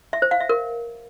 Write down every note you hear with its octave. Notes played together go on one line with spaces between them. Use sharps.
E5
C5
F5
E5
A#4